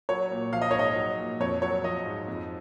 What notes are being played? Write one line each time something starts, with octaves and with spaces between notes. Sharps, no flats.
F#3 C#5
A#2
F3 F5
D#5
C#5
G#2 D#5
F#3
A#2
F2 C#5
F#3 C#5
F3 D#5
G#2
F2